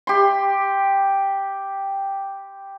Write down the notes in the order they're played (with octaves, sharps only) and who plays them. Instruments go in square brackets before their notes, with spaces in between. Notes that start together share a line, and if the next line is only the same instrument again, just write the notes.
[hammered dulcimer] G4 C6